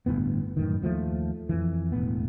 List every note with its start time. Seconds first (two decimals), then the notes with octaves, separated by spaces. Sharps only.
0.06 G1 D#2 A2 B3
0.57 F#2 A2 D#3
0.82 D#2 F3 G#3 A3
1.49 F2 E3
1.92 E1 A2 B3